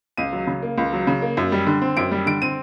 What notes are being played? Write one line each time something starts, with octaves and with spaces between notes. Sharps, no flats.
C#2 D#7
F#3
C#3
A#3
C#2
F#3
C#3
A#3
F#2
G3
D3
C4
F#2 D7
G3
D3 D7
C4 D#7